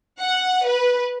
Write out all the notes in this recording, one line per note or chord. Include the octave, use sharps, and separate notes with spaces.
F#5
B4